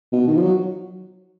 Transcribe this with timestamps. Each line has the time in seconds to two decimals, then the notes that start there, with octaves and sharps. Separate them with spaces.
0.13 B2
0.27 D#3
0.37 F3
0.42 F#3